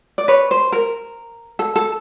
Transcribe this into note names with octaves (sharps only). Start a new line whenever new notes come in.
D5
B4 C#5
C5
A#4
A4
A4